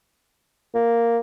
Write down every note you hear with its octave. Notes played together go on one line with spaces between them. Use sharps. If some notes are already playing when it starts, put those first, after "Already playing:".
A#3